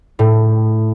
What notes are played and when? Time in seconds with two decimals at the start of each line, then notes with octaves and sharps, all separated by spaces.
0.19 A2